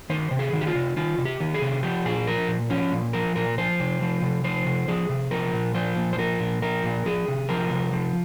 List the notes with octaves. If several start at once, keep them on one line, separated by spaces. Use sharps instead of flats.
D#3 C5
C3
G#4
D#3
G4
F4
C3
D#3 F4
C3
G4
D#3
G#4
C3
F3 G4
A#2 G#4
F3 A#4
A#2
F3 C#4
A#2
F3 A#4
A#2 A#4
F3 C5
C3
F3
C3
F3 C5
C3
F3 G#4
C3
F3 A#4
A#2
F3 C5
A#2
C5
F3 A#4
A#2
F3 A#4
A#2
F3 G#4
C3
F3 A#4
C3
F3